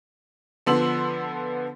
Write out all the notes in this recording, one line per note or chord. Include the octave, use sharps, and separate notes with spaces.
D3 F3 B3 C6 E6 F#7